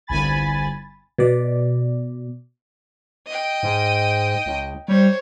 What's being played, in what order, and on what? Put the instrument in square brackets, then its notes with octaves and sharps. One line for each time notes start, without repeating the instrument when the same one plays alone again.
[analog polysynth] G1 C2 G#5 B5 A6
[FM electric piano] B2 D5
[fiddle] D#5 G5
[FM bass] G#2
C#2
[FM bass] G3 [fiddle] C5 C#5